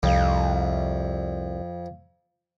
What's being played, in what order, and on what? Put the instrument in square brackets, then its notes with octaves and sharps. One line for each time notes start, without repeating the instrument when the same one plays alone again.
[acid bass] C2 [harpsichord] F2